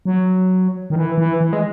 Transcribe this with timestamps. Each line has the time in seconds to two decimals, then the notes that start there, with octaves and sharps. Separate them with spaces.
0.05 F#3
0.90 D#3
0.96 E3
1.18 E3
1.41 E3
1.53 G#3